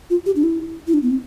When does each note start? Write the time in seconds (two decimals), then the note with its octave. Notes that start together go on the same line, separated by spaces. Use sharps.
0.10 F4
0.26 G4
0.36 D4
0.43 E4
0.87 E4
0.94 D4
1.03 B3
1.11 C4